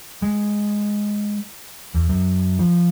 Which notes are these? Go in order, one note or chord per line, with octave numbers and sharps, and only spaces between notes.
G#3
E2
F#2
F3